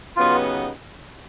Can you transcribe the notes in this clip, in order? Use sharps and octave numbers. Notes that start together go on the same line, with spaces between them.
C#3 F#3 B3 D#4 F4 G4